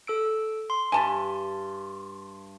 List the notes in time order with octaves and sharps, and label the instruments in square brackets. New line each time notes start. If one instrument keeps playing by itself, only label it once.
[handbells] A4 E6 D7
C6
[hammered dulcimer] G2 [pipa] G#5 A5 B5